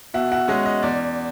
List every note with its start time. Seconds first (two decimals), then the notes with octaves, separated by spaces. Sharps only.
0.14 B2 E5 F#5
0.32 E5 F#5
0.48 G#3 C#4 D#5
0.66 D#5
0.83 E2 D5